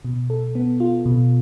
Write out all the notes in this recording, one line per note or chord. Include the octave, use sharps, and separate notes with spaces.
B2
A4
B3
F4
B2